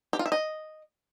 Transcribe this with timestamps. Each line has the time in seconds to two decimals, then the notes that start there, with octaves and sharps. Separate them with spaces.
0.13 G4
0.19 F4
0.26 E5
0.32 D#5